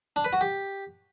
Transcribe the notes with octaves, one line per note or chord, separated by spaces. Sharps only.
D4
B4
F#4
G4